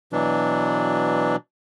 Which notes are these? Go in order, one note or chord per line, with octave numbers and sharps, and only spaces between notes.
B2 E3 F#3 D4